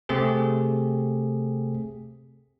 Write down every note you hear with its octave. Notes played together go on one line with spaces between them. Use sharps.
C3 A3 C4 G4 G#4